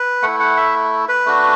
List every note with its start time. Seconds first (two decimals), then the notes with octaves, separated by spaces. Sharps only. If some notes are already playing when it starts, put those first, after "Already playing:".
Already playing: B4
0.22 A3 E4 F#5
0.40 F#5
0.57 E5
1.09 B4
1.26 A3 D4 F#4